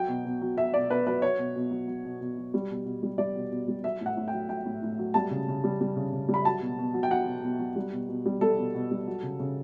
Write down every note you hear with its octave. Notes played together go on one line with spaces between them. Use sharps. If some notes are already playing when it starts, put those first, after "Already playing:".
Already playing: F#3 G5
B2
B2
F#3
F#3 E5
B2 D5
B2 B4
F#3 B4
F#3 C#5
B2
B2
F#3
F#3
B2
B2
F#3
G3
B2
B2
G3
G3 D5
B2
B2
G3
F#3 E5
A2 F#5
A2
F#3 G5
F#3 G5
A2
A2
F#3
G3 A5
C#3
C#3
G3
G3
C#3
C#3
G3
B5
F#3 A5
B2
B2
F#3
G5
F#3 F#5
B2
B2
F#3
G3
B2
B2
G3
G3 A4
B2
B2
G3
F#3
C#3
C#3